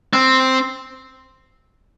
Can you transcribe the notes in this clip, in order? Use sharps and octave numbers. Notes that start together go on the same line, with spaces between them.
C4